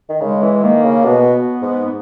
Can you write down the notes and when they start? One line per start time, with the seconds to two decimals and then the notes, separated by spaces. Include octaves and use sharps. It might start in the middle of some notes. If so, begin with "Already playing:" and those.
0.10 D#3
0.21 C#3 G#3
0.43 E3
0.63 D#3 A#3
0.84 C#3
1.05 B2 B3
1.62 G#2
1.86 B3